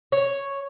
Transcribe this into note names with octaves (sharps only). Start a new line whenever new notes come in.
C#5